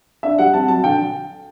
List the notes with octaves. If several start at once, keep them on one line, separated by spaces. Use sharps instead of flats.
D4 E5
G3 F#5
C4 A5
F#3 A5
D3 G5